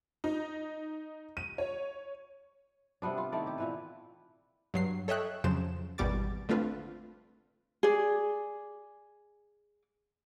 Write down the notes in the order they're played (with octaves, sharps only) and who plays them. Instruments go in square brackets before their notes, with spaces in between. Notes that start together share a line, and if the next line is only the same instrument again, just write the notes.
[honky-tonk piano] D#4
D#7
C#5
[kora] C3 G3 B3 D4
F4
D#3 A3 E4 D5
G4 D5
A#2 E3 B4
[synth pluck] G2 F#3 C7
A4 C#5 D#5 E5 G5 F#6
F2 C#3 F3 F#3 C5 E7
G#1 E2 B2 G3 D6 A6
D3 A3 C4 F4 B4
[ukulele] G#4 D5